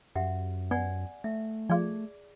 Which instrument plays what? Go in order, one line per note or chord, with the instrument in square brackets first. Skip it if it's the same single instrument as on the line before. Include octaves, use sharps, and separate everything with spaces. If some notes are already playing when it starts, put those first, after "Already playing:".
[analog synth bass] F#2 [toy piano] G4 E5 F#5
[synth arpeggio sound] B3 [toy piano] D5 F#5 G#5
[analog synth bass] A3 [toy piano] E5
[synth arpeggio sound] F3 F4 [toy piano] G#4 D5